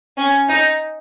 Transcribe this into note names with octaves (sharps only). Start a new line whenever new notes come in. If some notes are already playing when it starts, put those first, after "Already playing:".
C#4
D#4